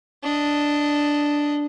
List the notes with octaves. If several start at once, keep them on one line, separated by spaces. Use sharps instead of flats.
D4 D#5